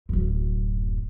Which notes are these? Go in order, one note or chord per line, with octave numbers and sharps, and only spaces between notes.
D1 F#2